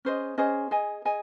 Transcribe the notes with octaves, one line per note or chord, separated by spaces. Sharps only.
C#4 G#4 C5 D#5
C#4 G#4 C5 D#5
G#4 D#5 G#5
G#4 D#5 G#5